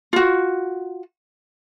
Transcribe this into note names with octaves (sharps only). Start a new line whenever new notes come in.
F4 F#4